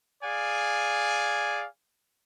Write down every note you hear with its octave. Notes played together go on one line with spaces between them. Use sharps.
G#4 D5 F5 G#5